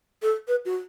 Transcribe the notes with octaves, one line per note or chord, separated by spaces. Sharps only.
A4
B4
F#4